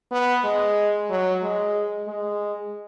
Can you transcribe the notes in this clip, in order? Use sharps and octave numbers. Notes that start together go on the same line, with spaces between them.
B3
G#3
F#3
G#3
G#3